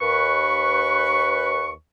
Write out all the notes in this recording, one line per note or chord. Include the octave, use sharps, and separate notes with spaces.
D#2 B4 C#6